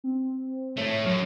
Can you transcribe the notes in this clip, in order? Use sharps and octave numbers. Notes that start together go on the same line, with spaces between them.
C4
A2 A3 C#5
F#2 F6